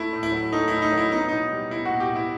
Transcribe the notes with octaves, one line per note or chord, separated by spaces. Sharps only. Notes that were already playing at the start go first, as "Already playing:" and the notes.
Already playing: A3 E4
A2
E4
F#3
A3 D#4
A2 E4
D#4
F#3
E4
B3 D#4
B2 D#4
G3
B2 E4
F#4
B2
G4
B2
E4